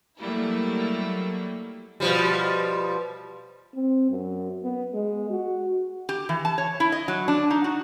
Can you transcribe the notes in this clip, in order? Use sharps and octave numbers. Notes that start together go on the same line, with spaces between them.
F#3 G3 A3 A#3 E4
B2 F3 G3
C4
F#2
B3
G#3
F#4
G4
E3
A5
C#5
E4
D#5
F#3
D4
D#4
F#4